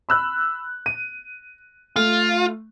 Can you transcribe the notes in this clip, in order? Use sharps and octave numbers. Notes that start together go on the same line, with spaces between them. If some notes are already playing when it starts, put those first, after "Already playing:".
B5 E6 F#6
D#7
A3 F4